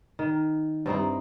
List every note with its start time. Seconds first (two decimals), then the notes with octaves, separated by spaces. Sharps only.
0.19 D#3
0.86 G2 C4 D#4 E4